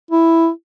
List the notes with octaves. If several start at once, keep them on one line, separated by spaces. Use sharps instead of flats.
E4